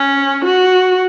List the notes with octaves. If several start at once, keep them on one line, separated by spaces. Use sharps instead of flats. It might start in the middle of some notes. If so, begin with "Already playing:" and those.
Already playing: C#4
F#4